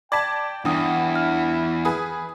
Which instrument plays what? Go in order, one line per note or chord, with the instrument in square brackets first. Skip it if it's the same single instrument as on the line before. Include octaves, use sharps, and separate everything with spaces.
[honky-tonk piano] D5 A5 [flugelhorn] G5 [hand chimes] D6 G#6 B6
[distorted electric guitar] E2 [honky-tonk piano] G2 [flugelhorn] E4 [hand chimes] F#5 G5 D#6
[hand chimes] F6
[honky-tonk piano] G#4 B4 D#6